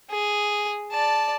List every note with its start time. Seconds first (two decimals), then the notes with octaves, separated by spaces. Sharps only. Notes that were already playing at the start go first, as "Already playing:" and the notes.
0.10 G#4
0.91 D5 A5